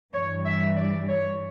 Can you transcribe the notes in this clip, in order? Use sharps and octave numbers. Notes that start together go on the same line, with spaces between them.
G2 E3 G3 C#5
E5
D5
C#5